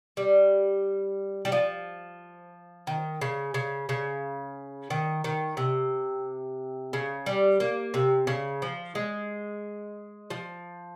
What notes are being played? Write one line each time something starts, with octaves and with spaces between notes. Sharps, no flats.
G3
G3
F3
D#3
C#3
C#3
C#3
D#3
D#3
C3
C#3
G3
A#3
C3
C#3
F3
G#3
F3